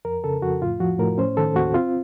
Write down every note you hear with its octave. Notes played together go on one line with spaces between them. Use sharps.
F2 A#4
C#3 A4
F2 F#4
A2 F4
F3 F#4
A2 A#4
C#4 C5
D#3 A4
D#2 F#4
C4 F4